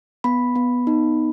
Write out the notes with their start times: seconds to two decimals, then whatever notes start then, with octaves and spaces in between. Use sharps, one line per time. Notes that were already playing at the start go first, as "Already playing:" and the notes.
0.24 B3 B5
0.55 B3
0.87 D#4